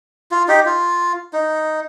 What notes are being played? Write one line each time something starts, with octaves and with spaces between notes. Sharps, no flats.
F4
D#4 G4
F4
D#4